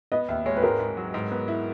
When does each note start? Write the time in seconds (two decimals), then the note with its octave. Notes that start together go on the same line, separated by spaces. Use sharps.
0.12 B3 D#5
0.28 D#2 E5
0.46 G#3 C#5
0.57 B4
0.63 G#2 A#4
0.80 G#2
0.97 F#3
1.14 G#2
1.32 B3
1.48 E4